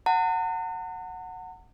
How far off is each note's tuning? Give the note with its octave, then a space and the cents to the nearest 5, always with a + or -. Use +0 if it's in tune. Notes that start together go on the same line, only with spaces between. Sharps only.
F#5 +0 A#5 -45